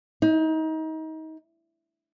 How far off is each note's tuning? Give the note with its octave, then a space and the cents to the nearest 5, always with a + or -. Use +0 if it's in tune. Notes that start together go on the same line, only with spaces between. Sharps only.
D#4 +30